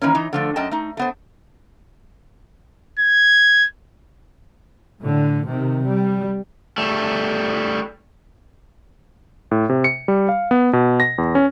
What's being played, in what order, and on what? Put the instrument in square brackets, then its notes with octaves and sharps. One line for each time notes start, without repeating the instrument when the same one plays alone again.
[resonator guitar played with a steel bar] D#3 E3 A#3 C#4
E3 D#4
D3 F3 A3
F#2 D#5 G5 A5
A3 D#4
A3 B3 C5
[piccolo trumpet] G#6
[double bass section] A2 D3
C3 D#3
G3
[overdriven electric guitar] G3 A3
[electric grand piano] A2
C3
C#7
G3
F5
B3
B2
A#6
E2
C#4